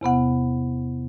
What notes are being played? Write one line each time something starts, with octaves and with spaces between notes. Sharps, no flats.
E2 C3 B3 F#5